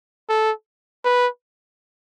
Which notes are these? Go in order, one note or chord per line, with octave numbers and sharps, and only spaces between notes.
A4
B4